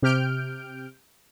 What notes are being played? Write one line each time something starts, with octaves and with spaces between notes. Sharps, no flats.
C3 G4 F6 G6 D7